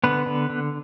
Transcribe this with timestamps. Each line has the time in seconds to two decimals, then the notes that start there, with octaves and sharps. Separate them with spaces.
0.04 D3 B3 B4
0.27 D3
0.50 D3